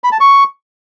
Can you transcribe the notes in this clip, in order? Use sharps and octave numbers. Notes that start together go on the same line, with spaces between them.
B5
A5
C#6